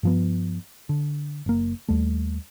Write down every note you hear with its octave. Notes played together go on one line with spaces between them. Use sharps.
G2 F3 B3
D3
F#1 A#3
D#2 G3 A3